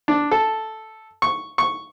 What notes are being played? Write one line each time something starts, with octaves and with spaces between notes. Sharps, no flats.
D4
A4
C#6
C#6